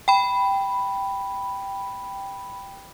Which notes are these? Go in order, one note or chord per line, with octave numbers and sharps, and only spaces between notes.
G5 B5